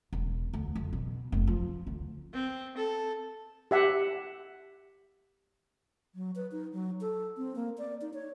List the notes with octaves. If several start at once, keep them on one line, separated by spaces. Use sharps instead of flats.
E1
D2
F2
B2
F1
F3
D2
C4
A4
G4 E5 F#5
F#3
B4
D#4
F#3
A4
C4
A#3
D5
D#4
C#5